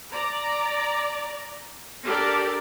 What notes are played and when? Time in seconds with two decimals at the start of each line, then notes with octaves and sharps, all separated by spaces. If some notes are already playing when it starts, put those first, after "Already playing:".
0.12 D5 A#5
2.04 D4 G4 A4 A#4 D5